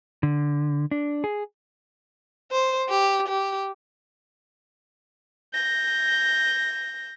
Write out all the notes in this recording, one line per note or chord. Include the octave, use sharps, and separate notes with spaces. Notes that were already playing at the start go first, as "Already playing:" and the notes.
D3
D4
G#4
C5
G4
G4
G6 A#6